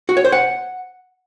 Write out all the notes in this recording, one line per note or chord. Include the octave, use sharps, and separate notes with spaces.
F#4
C#5
C5
F#5